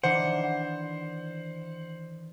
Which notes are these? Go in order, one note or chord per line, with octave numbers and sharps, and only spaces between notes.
D#3 E3 D4 C5 F#5